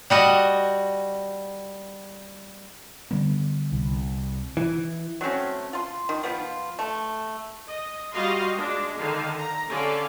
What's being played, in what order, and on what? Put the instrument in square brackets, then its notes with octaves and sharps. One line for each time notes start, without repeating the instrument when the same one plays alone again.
[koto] G3 F#4 D#5
[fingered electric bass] D3 G3 B3
[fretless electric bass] C2
[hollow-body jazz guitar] E3
[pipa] F#3 A3 C4 C#4
F4 C6
D#3
F3 B3 F4
A3
[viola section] D#5
G3 F4 F#4 D#5 F5 C6
G#3 D4
D3 D#3 F5
A#5
D3 C#4 A4 D5 F5